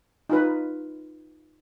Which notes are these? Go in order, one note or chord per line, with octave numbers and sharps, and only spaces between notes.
D#4 F4 B4